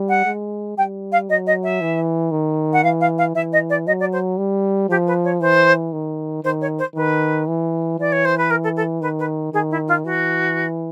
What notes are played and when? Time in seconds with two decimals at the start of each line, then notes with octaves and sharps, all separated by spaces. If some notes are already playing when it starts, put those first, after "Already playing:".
Already playing: G3
0.09 F#5
0.26 G#3
0.77 G3 G5
1.12 F5
1.29 F#3 D#5
1.46 D#5
1.63 E5
1.81 E3
2.32 D#3
2.73 F#5
2.83 E3 F5
3.00 F5
3.18 F5
3.35 E3 E5
3.52 D#5
3.69 D5
3.87 F#3 D#5
4.00 D5
4.12 C5
4.38 G3
4.89 F3 G4
5.07 B4
5.24 C#5
5.40 E3 C5
5.93 D#3
6.44 D#3 C5
6.61 C#5
6.78 C5
6.95 D#3 B4
7.48 E3
7.99 E3 D5
8.12 C#5
8.25 C5
8.37 B4
8.50 A#4
8.63 A4
8.76 A4
9.01 D#3 B4
9.19 B4
9.53 D#3 G#4
9.70 E4
9.88 F4
10.04 E3 F#4